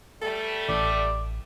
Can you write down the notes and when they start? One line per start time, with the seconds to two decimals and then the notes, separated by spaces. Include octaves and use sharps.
0.22 G3 A3 A4
0.69 A1 D5